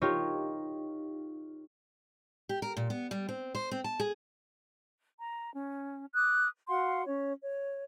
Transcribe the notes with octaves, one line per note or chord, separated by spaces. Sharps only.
D#4 F4 G4 A#4 C#5
G4
A#4
A#2
B3
G3
C4
C5
C4
A5
G#4
A#5
C#4
D6 D#6 F#6
F#4 F5 F#5 C6
C#4 C#5
C#5